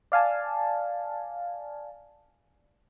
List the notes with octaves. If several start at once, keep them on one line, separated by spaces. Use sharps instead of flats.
D5 F5 G#5 A5